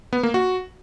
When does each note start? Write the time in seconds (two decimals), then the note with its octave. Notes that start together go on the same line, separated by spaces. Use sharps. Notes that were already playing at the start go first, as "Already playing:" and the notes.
0.13 B3
0.23 A#3
0.34 F#4